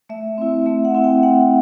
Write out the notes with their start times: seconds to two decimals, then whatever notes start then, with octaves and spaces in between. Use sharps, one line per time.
0.09 A3 E5
0.38 C4 E4
0.66 A3 E5
0.85 F#5
0.95 C4 E4
1.04 G5
1.23 A3 F#5